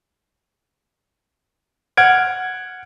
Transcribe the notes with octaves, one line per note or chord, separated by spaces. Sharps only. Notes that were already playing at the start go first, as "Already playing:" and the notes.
F#5 F6 G#6 D7